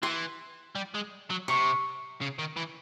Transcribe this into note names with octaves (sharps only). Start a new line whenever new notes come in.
E3 C6
G3
G#3
F#3
C3 C#6
C#3
D#3
E3